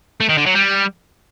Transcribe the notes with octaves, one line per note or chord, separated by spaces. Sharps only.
A3
D#3
D3
F#3
G3